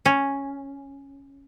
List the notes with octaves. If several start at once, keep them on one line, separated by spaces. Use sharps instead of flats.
C#4